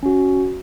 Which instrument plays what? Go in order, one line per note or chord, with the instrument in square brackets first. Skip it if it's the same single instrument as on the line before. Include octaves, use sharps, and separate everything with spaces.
[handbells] C#4 F#4